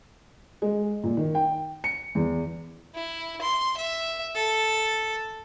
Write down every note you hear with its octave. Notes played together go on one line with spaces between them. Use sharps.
G#3
A#2
D#3
G5
C#7
E2
E4
C6
E5
A4